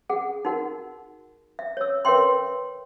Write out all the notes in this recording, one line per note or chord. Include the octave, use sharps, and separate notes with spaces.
G#4 F#5
D#4 F#4 A#4 F#5
E5
C#5 E6
A#4 B4 C#5 E5 G5 C6